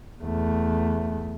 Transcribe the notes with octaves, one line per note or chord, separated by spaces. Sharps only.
E2 A3